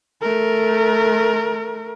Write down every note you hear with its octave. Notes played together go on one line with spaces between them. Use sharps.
A3 A#4